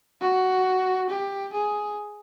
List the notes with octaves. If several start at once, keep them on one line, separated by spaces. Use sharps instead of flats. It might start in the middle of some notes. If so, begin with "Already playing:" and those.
F#4
G4
G#4